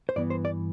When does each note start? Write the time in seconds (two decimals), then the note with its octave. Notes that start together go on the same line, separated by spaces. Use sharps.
0.09 C5
0.16 G2 E3 B3 D5
0.30 C5
0.45 D5